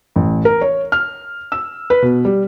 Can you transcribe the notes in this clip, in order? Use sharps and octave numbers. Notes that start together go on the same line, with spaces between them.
A1
A#4
C#5
F6
E6
B4
B2
G3